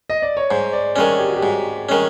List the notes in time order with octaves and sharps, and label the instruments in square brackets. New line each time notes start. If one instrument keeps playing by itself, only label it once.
[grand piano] D#5
D5
C#5
[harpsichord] G#2 [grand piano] C5
[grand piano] D5
[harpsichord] D#3 G#3 C#4 [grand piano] C#5
[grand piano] G4
F#4
G4
[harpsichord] G#2
D#3 G#3 C#4